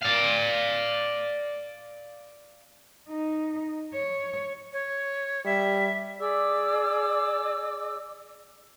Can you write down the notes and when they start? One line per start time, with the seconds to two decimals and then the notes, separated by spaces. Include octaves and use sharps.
0.02 D5 F5
3.09 D#4
3.93 C#5
4.73 C#5
5.45 G3 E5
6.19 G#4 D5 D6 E6